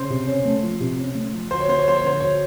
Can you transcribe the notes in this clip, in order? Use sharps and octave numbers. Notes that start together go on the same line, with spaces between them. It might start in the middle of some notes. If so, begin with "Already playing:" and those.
Already playing: C#3 C5
C3
C#4
A3
F3
C3
C#4
A3
F3
D2 C5
C#5
A#3 C5
C#5
F3 C5
C#5
D3 C5
D2 C#5